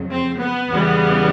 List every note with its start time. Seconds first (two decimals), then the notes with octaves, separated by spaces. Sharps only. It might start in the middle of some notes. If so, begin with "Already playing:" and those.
Already playing: F2 C#3 F#3
0.11 C4
0.40 B3
0.70 E2 C#3 E3 G3